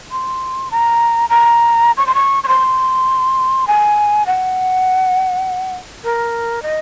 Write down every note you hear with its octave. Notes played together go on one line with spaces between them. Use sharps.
C6
A#5
A#5
C#6
C6
C#6
C#6
C6
G#5
F#5
A#4
D#5